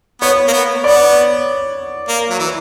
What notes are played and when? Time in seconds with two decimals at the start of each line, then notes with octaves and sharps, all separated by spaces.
0.21 B3 C#5
0.48 A#3
0.53 B3
0.84 B3 D5
2.08 A#3
2.30 F#3
2.39 E3